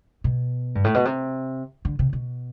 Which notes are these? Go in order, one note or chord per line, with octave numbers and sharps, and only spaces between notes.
B2
G2
A2
B2
C3
D3
C3
B2